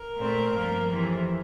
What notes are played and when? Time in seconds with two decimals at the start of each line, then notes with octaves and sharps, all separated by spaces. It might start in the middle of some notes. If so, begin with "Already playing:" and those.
Already playing: A#4
0.17 A#2 A3 C4
0.54 G2 F3 A#3
0.89 F2 C3 E3